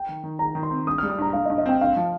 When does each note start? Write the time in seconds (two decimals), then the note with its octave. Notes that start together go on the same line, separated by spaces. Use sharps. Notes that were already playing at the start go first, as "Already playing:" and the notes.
Already playing: G5
0.09 D#3
0.24 D#3
0.39 D#3 A#5
0.55 D#3
0.63 C6
0.71 C4
0.87 G2 D#6
0.98 G3 F6
1.10 D#6
1.18 G2 A#5
1.33 G2 F5
1.45 D#5
1.50 G2
1.58 D#5
1.66 C4 G5
1.81 G2 F5
1.97 F3